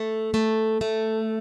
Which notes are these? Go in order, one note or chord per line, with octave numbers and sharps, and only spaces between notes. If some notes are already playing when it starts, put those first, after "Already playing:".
Already playing: A3
A3
A3